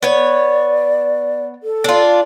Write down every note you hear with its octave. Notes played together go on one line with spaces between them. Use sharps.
B3 C#5 D5
A4
D4 F4